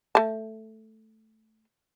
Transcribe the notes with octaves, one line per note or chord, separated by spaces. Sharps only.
A3 A5